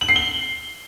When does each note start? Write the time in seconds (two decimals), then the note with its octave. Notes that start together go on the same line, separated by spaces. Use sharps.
0.01 F#7
0.09 C7
0.16 G7